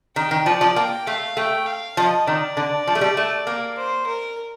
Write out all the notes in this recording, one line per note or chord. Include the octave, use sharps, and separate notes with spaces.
D#3 G5
D#3
F3 D5
F3
A#3 G5
A3 F5
A3 G5
F5
F3 D#5
D#3 D5
D3
F3
A3
G3
A3
A#3
C5
A#4